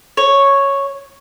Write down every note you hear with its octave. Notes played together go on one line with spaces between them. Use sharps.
C#5